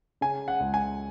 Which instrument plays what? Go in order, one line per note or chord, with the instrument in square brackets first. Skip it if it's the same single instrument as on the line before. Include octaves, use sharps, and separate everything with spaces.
[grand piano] C#3 G#5
F#5
C#2
G#5